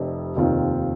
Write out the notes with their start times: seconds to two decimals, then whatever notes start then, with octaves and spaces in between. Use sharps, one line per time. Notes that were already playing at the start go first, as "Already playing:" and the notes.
Already playing: F1 F2 C3
0.36 F1 D#2 D#3 C4 F4